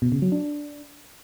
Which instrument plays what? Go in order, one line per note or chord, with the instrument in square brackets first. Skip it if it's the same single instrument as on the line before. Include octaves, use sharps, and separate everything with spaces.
[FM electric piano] B2
C#3
F#3
D4